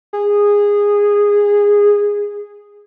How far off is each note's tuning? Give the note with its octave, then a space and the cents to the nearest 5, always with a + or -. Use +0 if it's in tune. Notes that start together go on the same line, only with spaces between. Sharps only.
G#4 -15